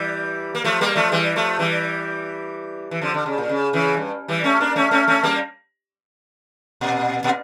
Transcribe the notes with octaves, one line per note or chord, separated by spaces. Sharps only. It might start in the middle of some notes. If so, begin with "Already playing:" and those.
Already playing: E3 G3
A#3
F3 A3
G3 A#3
F3 A3
E3 G3
F3 A3
E3 G3
E3
D3 F3
D3
C#3
A#2
C#3
C#3 E3
G2
E3 G3
A3 C#4
A#3 D4
A3 C#4
A3 C#4
A3 C#4
G3 A#3
A#2
A#2